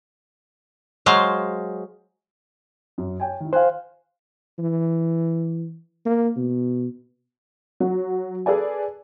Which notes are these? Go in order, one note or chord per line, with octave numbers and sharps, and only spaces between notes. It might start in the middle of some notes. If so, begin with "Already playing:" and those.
F#3 G#3 C5 F5
F#2
C#5 G5 G#5
D#3 E4
C5 F5 G5 G#5 F#6
E3
A#3
B2
F#3 F#4
G#4 A4 B4 D5 G#5